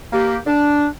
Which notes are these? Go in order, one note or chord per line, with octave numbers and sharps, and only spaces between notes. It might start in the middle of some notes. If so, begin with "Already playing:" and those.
A#3 G4
D4